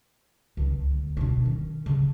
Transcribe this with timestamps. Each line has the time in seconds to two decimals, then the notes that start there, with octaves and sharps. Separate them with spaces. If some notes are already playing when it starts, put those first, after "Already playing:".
0.57 C#2 D#3
0.90 D2
1.17 B2 D4
1.44 D#3 C#4
1.86 C#3